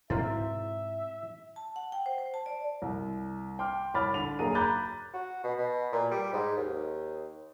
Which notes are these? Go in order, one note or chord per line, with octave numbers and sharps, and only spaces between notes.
G#2 B2 C4 E4 C5 E5 F5
A5
F#5
G5
C5
C5
A5
D5
C2
G5 C6 D6 F6
C2 C#5 B5 D6 F6 A6
D3 F7
F#1 B1 G#4 A#4 D#7
A#5 B5 D6 F#6 G6 A6
F#4
B2
B2
A#2
G3
G#2
D#2